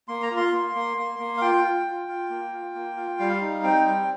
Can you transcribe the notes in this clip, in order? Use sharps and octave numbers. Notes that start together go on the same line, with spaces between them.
A#3 C6
A#5
F4
C6
A#3
A#3
A#3
A#3
F5
F4 G5
F4
F4
F4
A#3
F4
A#3
F4
G3 F5
D#4
C4 G5
G3